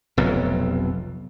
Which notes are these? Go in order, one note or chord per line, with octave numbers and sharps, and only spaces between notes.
F1 B1 F2